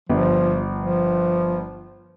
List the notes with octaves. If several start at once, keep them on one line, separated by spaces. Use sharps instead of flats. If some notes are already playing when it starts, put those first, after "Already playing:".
G1 F3
F3